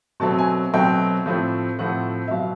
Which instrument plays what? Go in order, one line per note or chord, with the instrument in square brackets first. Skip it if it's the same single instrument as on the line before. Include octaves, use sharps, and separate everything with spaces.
[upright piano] B2 F#3 A3 C4 A5
G#5
B2 F#3 A3 C4 G5
A2 F3 A3 C4
A2 F3 A3 C4 F#5
E5
B2 F#3 F5